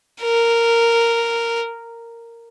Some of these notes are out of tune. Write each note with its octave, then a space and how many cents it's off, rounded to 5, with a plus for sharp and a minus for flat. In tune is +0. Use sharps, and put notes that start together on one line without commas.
A#4 -10